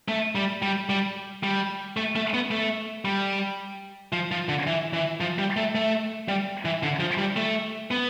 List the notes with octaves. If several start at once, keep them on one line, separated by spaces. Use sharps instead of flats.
A3
G3
G3
G3
G3
A3
A3
B3
A3
G3
F3
F3
D3
E3
E3
F3
G3
A3
A3
G3
E3
D3
F3
G3
A3
B3